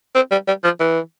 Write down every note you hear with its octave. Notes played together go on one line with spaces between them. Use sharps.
C4
G3
G3
F3
E3